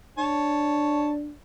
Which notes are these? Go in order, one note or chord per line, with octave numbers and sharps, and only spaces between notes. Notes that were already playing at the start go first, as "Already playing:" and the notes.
D4 C#5 A5